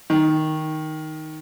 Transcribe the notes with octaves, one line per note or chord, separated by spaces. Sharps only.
D#3